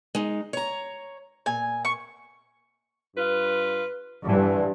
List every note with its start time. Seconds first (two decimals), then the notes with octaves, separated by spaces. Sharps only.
0.15 G#3 D#4
0.53 C#5 A#5
1.46 A#2 G#5
1.85 C#6
3.16 G2 F4 B4
4.26 G2 D3 E3